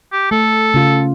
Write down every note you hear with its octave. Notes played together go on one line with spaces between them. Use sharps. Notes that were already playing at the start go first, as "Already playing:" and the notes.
G4
A3 A4
C#3 F4